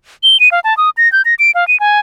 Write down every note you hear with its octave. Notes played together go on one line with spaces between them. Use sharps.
G7
D#7
F5
A5
D#6
A#6
G6
A#6
D7
F5
D#7
G#5